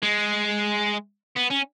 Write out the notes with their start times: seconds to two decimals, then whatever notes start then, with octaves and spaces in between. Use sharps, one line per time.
0.03 G#3
1.37 B3
1.51 C#4